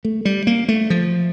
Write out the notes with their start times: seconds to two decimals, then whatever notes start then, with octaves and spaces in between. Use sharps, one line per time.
0.05 A3
0.25 G3
0.47 A#3
0.68 A3
0.90 F3